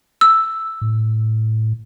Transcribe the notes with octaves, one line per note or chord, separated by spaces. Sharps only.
E6
A2